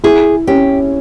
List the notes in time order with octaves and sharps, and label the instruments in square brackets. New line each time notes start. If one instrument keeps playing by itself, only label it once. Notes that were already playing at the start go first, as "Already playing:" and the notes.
[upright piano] E4 [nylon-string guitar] G#4
[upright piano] C#4 [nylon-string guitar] G4